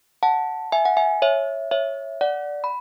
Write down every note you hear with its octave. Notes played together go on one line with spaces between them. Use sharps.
F#5 A5
E5 G#5
F#5
E5 G#5
C#5 E5
C#5 E5
D5 F#5
B5